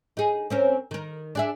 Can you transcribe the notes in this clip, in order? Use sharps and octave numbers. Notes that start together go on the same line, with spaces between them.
D#4 G#4
C4 C#4 A#4
D#3 A#4
D4 G#4 E5